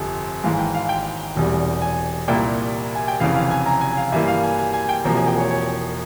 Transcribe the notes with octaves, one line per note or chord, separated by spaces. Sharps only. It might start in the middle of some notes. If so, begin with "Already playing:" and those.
Already playing: G1 F2 C3 F3
G#1 G#2 E3 G#3 F5
G5
F5
G5
E1 E2 C3 G3
G#5
C2 A#2 G3 A#3 E4 G5
G#5
G5
F1 F2 C#3 E3 F5
F5
G#5
A#5
G#5
F5
G2 E3 A#3 E5
F5
G#5
G#5
G#5
G5
E1 E2 C3 F3 A#3 A#5
G#5
G5
C#5
C#5